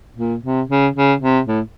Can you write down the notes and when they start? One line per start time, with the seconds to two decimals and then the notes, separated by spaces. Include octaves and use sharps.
0.17 A#2
0.43 C3
0.69 C#3
0.96 C#3
1.22 C3
1.47 A2